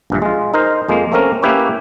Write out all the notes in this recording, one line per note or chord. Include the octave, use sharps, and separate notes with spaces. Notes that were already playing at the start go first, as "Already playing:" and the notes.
A#1 G2 E3
G#3 F4
D#4 A#4 C5
F2 G#3 A#3
A3 A#3 C4 C#4 A#4
A#3 C#4 E4 G4 B4 C#5